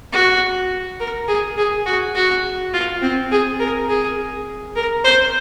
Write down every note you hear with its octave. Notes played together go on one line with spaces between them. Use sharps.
F#4
A#4
G#4
G#4
F#4
F#4
F4
C4
G#4
A#4
G#4
A#4
C5